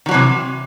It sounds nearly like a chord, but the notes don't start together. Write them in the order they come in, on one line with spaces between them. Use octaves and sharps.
D#3 F#3 E3 C3